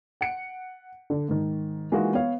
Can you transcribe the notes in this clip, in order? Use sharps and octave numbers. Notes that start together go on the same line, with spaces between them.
F#5 C#7 D7
D3
G#2 D#3
E3 G#3 A#3 D#4 F4 F#4
B3 B4 C#5 F5